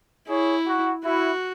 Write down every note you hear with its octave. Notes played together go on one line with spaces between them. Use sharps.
E4 G#4 C#5
F#4
E4 F#4